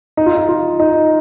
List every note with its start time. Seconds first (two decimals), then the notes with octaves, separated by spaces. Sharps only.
0.17 D#4
0.26 F4
0.35 D#4
0.49 F4
0.80 D#4